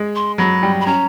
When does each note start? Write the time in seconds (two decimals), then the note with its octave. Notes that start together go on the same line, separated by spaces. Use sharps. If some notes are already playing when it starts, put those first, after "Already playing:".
Already playing: G#3
0.16 C6
0.38 F#3 B5
0.63 G3
0.81 B5
0.86 C#4 A#5